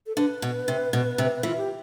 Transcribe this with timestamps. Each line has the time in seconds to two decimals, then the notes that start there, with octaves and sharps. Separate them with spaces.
0.07 A4
0.17 D3 B4
0.42 B2
0.68 C3
0.93 B2
1.18 C3
1.43 E3 F4
1.57 G4